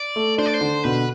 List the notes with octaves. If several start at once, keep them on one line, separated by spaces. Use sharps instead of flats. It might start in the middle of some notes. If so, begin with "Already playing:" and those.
Already playing: D5
A3
D4 C5
D5
C5
D3
B2 B4